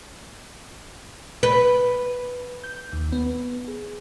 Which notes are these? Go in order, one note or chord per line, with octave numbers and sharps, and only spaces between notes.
B4
G6
D#2
B3
G#4